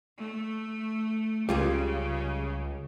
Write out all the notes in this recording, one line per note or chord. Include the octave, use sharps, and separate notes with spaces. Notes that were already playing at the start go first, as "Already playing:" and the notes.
A3
C#2 C#3 G3 F4 G#4